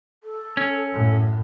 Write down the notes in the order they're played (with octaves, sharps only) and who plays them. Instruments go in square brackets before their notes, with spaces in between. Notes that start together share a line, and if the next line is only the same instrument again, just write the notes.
[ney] A4
[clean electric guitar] C#4
[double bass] F#2 A2